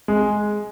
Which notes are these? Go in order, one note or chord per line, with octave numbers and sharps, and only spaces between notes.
G#3